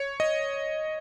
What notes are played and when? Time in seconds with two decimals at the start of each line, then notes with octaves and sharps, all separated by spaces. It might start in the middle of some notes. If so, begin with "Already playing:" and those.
Already playing: C#5
0.20 D#5